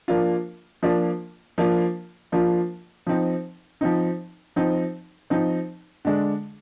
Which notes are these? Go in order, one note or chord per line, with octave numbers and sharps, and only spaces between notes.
F3 A#3 D4 F4
F3 A#3 D4 F4
F3 A#3 D4 F4
F3 A#3 D4 F4
F3 C4 D#4
F3 C4 D#4
F3 C4 D#4
F3 C4 D#4
D3 G#3 D4